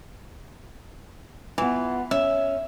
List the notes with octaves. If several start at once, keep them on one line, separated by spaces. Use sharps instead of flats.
E3 B3 F4
C#4 E5